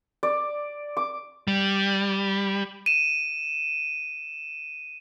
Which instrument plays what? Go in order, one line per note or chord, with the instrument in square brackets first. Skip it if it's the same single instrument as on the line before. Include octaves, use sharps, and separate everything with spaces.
[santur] D5
D6
[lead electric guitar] G3
[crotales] D#7 E7